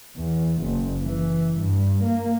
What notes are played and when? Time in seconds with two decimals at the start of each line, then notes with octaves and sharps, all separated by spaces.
0.16 E2
0.62 F#1
1.04 E3
1.60 G2
2.05 A#3